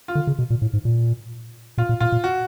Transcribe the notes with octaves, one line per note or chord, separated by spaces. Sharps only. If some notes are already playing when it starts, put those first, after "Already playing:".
F4
D3
C#3
B2
A#2
A2
G#2
A#2
A#2 F4
A#2
A#2 F4
A#2
F#4